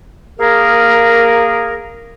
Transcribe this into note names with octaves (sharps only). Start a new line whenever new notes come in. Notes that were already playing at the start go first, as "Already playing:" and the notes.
A#3 G#4 A#4